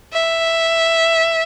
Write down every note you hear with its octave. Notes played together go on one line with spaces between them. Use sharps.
E5